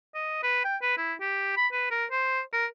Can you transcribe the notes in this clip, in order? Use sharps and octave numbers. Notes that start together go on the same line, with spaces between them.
D#5
B4
G5
B4
E4
G4
B5
B4
A#4
C5
A#4